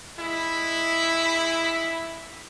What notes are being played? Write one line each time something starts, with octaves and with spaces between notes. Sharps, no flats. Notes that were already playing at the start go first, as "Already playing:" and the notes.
G#3 E4